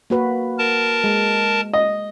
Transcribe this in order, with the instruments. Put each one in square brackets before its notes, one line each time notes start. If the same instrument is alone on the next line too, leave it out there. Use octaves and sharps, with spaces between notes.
[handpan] A#3 F#4 B4
[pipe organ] A#4 A5
[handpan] G#3
[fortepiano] D#5